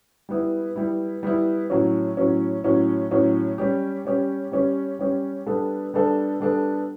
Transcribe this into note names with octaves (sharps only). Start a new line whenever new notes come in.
G3 B3 E4
G3 B3 E4
G3 B3 E4
A2 F#3 C#4
A2 F#3 C#4
A2 F#3 C#4
A2 F#3 C#4
G3 C#4 G4
G3 C#4 G4
G3 C#4 G4
G3 C#4 G4
G3 B3 D4 A4
G3 B3 D4 A4
G3 B3 D4 A4